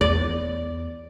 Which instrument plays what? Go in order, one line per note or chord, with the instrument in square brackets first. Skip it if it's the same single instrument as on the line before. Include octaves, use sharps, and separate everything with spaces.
[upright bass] E2 [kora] D5